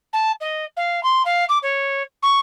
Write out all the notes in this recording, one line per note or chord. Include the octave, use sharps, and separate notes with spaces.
A5
D#5
F5
C6
F5
D6
C#5
C#6